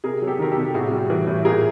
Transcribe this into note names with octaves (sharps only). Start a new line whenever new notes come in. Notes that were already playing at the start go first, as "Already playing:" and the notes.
C3 G#4 A#4
F#3
G4 A4
D#3 A#4
G4 A4
C3
A2 F#4 G#4
G3
E3
A2
A#2 G#4 A#4